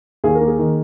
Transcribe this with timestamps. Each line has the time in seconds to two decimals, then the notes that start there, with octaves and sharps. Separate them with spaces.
0.24 D#2 G#4
0.35 A#4
0.41 A#3
0.47 G#4
0.59 D#3